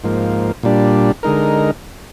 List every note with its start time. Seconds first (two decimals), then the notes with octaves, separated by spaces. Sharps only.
0.04 G#2 F3 A#3
0.63 A#2 G3 D4
1.23 D3 G#3 D#4 A#4